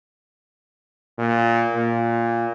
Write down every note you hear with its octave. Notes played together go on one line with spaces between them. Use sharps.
A#2
A#2